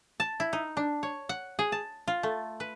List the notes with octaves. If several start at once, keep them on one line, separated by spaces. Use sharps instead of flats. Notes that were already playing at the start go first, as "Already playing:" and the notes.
A5
E4
D#4
D4
C#5
F#5
G#4
A5
F4
A3
B4